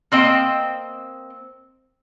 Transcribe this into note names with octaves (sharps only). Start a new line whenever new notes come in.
A#3 C4 D#5 G5